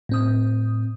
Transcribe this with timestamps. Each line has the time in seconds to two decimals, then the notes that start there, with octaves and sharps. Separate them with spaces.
0.09 A2 C4 D#6